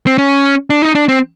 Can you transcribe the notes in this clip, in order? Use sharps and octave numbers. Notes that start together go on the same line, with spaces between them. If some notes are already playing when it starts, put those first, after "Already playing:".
C4
C#4
D4
D#4
D4
C4